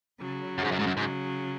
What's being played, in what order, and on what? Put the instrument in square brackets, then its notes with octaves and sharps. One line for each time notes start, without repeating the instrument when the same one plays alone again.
[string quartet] C#3 F#3
[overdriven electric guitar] F#2
G#2
F#2
G#2
F#2
[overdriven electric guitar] G#2 [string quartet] C#3 F#3